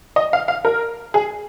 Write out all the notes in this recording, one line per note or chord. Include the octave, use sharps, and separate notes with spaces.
D#5
F5
F5
A#4
G#4